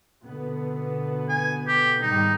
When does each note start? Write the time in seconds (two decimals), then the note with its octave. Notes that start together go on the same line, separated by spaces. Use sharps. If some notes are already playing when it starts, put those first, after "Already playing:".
0.24 B2 D3 B3
1.29 G#5
1.68 G4
2.02 G#2 D#3 G3 D#4